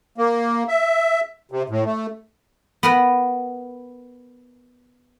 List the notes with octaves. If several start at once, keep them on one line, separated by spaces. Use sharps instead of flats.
A#3
E5
C3
A2
A3
B3 A#4 B4